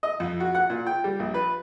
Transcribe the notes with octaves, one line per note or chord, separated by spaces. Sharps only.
D#5
F2
F#4
F#5
A#2
G5
G3
A#1
B4